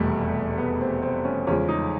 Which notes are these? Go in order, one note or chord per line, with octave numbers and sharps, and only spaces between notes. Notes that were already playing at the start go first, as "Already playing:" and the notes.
Already playing: F1 E2 B2 G3 A3
B3
C4
C4
C#4
E2 C#3 F3 G#3 C#4
D#4